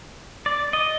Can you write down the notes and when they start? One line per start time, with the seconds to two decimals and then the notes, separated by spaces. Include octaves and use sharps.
0.46 D5
0.73 D#5